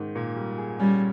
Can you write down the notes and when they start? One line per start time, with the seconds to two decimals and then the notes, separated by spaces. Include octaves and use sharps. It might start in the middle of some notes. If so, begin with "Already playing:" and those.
Already playing: G#2 D#3
0.15 A#2
0.36 G3
0.58 G#4
0.80 G3 C#4